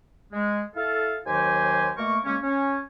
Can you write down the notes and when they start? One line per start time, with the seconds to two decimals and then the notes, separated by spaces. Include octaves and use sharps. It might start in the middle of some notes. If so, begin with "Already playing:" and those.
0.32 G#3
0.76 E4 A4 F5
1.26 D#2 D#3 F#3 G4 C5 G#5
1.97 B2 A3 A#3 A#4 C#6
2.25 C#3 G#3 A#3 C#4
2.42 C#4